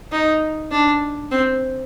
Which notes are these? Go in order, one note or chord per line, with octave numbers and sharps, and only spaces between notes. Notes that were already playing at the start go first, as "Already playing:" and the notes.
D#4
D4
C4